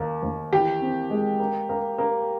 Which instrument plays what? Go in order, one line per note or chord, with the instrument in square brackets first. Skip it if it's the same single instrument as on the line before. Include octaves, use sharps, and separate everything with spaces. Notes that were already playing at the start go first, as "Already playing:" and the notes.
Already playing: [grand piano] D#2 A#3
D#2
[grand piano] E3 [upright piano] G4
[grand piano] C4
G#3
A#3
A#3
A#3